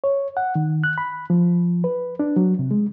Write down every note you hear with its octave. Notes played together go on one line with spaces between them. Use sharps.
C#5
F#5
D#3
F#6
B5
F3
B4
D4
F#3
C3
G#3